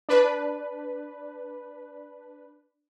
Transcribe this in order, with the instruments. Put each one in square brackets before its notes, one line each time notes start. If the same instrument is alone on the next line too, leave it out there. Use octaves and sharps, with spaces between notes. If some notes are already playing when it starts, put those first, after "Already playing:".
[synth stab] D4 B4